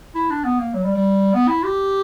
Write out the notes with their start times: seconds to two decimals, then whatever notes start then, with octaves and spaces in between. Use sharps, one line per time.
0.15 E4
0.30 D4
0.44 B3
0.60 A#3
0.74 F#3
0.84 G3
0.94 G3
1.34 B3
1.48 E4
1.64 G4